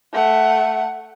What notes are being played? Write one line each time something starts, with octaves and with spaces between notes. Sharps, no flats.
A3 F#5